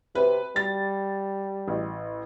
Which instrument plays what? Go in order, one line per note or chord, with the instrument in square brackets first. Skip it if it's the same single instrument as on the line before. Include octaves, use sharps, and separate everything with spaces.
[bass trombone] C3 [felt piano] B4
[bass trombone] G3 [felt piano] A6
[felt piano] A1